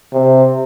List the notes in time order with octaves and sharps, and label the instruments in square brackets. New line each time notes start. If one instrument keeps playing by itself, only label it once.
[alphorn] C3